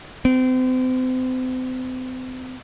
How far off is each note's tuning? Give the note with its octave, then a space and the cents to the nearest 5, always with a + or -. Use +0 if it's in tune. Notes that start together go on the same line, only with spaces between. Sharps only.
C4 -35